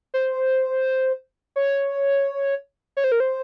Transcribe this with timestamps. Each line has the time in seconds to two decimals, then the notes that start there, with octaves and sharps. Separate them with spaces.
0.14 C5
1.56 C#5
2.97 C#5
3.04 C5
3.12 A#4
3.20 C5